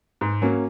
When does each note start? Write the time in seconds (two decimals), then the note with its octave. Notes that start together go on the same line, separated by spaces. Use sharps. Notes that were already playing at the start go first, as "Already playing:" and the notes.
0.21 G#2
0.42 F#3 A#3 C#4